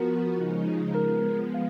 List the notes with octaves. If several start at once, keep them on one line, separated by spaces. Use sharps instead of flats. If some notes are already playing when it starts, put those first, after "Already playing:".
Already playing: F3 B3 F#4 A#4
C#3 F3 G#3 D#4
F3 G#3 B3 A#4
F5